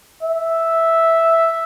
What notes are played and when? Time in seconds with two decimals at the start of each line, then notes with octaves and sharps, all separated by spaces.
0.22 E5